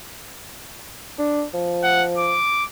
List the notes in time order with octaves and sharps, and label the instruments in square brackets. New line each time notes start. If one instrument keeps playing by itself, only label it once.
[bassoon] D4
F3
[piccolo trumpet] F#5
D6